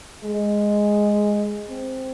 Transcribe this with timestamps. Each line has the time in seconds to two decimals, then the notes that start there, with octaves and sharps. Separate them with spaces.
0.24 G#3
1.69 C4